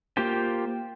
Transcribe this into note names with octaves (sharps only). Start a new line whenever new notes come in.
A#3 F4 G4 C5 G5